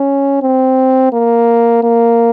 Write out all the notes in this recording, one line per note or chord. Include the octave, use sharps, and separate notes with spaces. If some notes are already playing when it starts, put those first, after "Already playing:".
Already playing: C#4
C4
A#3
A#3